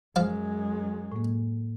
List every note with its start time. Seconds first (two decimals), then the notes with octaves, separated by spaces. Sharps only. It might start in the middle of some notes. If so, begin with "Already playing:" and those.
0.16 F#2 F3 G#3 F5
1.12 A2 A#3